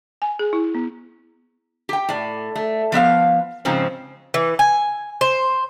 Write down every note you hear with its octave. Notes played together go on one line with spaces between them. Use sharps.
G#5
G#4
E4
B3
G4 G5
A2 D5
A3
F3 B3 E5 F5
G#2 C#3 F3 C4 C#4
E3
G#5
C5